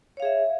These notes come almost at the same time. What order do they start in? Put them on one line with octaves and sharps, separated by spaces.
C#5 F5 G#4 E5